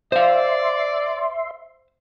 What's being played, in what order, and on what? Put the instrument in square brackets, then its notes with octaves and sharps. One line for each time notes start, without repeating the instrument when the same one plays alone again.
[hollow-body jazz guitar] C5 F5 [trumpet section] D5 [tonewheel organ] E5 C6